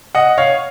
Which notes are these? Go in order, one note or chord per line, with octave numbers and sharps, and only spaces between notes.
D#5 F#5
C#5 F5